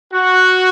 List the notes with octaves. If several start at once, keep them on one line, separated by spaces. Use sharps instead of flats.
F#4